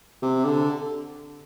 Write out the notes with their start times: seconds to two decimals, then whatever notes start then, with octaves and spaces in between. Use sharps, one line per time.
0.22 C3
0.45 D3